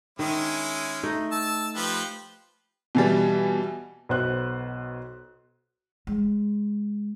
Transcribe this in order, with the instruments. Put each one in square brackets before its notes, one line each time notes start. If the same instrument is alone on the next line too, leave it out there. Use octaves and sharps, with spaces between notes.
[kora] D#3 [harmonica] G#3 C#4 E4
[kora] A3 D#4
[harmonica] A5 E6
F3 G4 B4
[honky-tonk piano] B2 E3 G3
[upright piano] B1 B3 C5 F#6
[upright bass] G#3